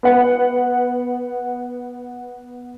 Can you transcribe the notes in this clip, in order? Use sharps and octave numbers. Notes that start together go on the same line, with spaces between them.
B3 B4 F#5